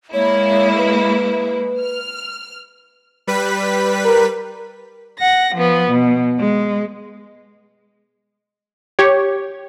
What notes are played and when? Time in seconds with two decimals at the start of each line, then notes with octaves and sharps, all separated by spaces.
0.13 G#3 A#3 E4 C#5
0.78 B4
1.80 F6
3.27 G3 B4 B6
4.05 A#4
5.19 F#5 A#6
5.55 F3 B3
5.91 B2
6.39 G#3
8.99 G4 C#5